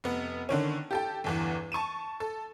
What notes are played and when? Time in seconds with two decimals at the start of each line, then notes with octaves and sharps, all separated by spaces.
0.04 F1 B3
0.49 D3 D#3 C#4
0.91 G4 A4 G5
1.24 G1 E2 E3
1.72 A5 C#6 D#7 E7
2.20 A4